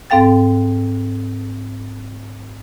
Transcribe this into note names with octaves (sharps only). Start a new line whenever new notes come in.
G#2 C4 A4 F5 G5 A6